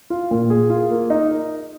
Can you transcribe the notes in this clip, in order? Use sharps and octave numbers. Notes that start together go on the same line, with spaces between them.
F4
A#2
G#4
F4
A#3
D#4